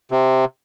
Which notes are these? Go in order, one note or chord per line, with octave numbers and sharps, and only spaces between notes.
C3